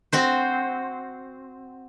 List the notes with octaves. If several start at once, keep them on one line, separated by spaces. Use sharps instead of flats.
C4 F#4 C5